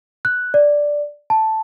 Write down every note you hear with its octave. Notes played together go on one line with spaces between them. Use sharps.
F#6
D5
A5